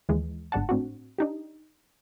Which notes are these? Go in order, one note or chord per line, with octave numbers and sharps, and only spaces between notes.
D#2 E3 G#3
G1 G#2 D4 F#5 A5
A2 C4 D4 F#4
D4 D#4 G4